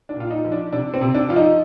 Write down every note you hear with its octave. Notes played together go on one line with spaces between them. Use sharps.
D4
A#2 F4
D#4
F3
D4
C3 D4
C4
C3
D4
F3 F4
D#4